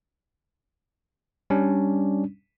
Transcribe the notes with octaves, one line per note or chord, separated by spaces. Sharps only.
G3 C#4 D4